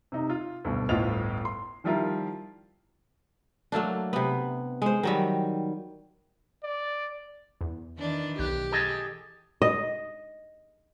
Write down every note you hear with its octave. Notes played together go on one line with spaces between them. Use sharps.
C3 D#4
F4
D2 G2 B2
G1 D2 A2 F4 D#5 F7
C6
D#3 F3 G3 E4 F4 A#4
F#3 A3 A#3 D4
C3 B3
G#3 C5
D#3 F#3 G3
D5
E2
D#3 E3 D4
B1 G4 F#6
G#4 A4 D#5
D#5